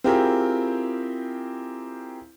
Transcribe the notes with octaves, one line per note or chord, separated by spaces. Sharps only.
C4 E4 F4 G4 G#4 A#4